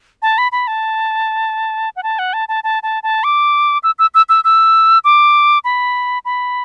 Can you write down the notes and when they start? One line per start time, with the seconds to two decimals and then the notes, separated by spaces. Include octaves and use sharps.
0.22 A5
0.38 B5
0.52 B5
0.67 A5
1.96 F#5
2.03 A5
2.19 F#5
2.33 A5
2.49 A5
2.64 A5
2.83 A5
3.03 A5
3.24 D6
3.83 E6
3.99 E6
4.15 E6
4.29 E6
4.44 E6
5.04 D6
5.64 B5
6.25 B5